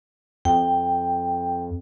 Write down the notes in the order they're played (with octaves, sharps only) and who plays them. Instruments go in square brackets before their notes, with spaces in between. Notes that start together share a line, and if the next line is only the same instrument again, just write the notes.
[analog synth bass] F2 [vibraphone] G5